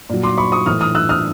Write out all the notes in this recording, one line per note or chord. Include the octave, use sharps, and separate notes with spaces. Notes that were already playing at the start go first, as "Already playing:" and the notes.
A#2 F#3
C6 D6
B5 C#6
C#6 D#6
A2 E3 D#6 F6
D#6 F6
E6 F#6
D#6 F6